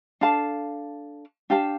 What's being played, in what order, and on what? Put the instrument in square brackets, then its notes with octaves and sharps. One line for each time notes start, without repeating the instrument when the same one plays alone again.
[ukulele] D4 A4 F5 A5
D4 G4 F5 A5